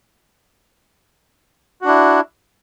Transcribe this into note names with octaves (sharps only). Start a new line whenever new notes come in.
D4 E4 F#4